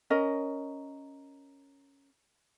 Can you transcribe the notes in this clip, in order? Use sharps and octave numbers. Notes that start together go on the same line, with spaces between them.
C#4 A#4 D#5